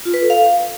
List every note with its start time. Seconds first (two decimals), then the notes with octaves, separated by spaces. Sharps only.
0.05 F4
0.14 B4
0.22 A4
0.30 F5